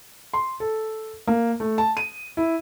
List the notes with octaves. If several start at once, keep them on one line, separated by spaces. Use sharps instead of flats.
C6
A4
A#3
A3
A5
D#7
E4